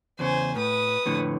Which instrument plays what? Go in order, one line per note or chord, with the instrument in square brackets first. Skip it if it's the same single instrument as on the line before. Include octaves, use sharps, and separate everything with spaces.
[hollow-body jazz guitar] E2 C#3 [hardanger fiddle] C5 G#5
[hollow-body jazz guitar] A2 [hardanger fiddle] B4 D#6
[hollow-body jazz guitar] F2 A2 D3